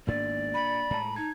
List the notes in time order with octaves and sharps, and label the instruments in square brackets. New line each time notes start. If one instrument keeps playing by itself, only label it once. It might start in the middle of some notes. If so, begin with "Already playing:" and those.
[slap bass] G#1 G#2 B3 [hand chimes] A#3 D4 [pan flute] D5
[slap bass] A#2 [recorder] B5
[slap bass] A2 G#3 [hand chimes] A5 A#5
[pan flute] D#4 [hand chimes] G#6